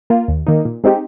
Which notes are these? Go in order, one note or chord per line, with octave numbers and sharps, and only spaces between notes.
A#3 F4
D#2
D#3 A#3 D#4
A#2
G#3 C4 D#4 G4